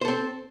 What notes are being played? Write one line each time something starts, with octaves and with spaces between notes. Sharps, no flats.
C4 A4 C5